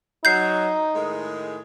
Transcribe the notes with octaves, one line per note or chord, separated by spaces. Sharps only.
F#3 D#4 G6 C7
A2 D#3 G#3